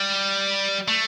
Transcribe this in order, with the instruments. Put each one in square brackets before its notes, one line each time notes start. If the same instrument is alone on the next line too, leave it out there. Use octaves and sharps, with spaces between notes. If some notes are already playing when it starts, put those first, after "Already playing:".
Already playing: [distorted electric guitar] G3
A3